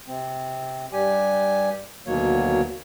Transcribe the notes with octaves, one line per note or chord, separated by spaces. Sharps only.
C3 C4
G2 G3 G4 G#5
D2 B2 D#3 F#3 A#3 C#5